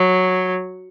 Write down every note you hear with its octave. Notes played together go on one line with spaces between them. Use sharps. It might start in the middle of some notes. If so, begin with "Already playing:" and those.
Already playing: F#3